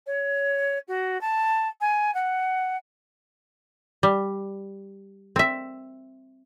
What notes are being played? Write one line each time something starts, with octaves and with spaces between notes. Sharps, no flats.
C#5
F#4
A5
G#5
F#5
G3
C4 E5